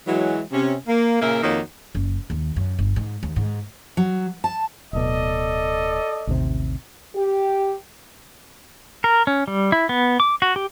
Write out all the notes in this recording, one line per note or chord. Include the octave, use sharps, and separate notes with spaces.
E3 F#3 G#3
C3 C#4
A#3
A#2 C#3 A#3 A#4 E5
F2 D#3 A#3 D#4 F#4 C#5
F#1
D#2
F#2
G1
G#2
D#2
G#2
F#3
A5
D1 B2 A4 D5 D#5
A1 D#2 C3
G4
A#4
C#4
G3
E4
B3
D6
F#4
G4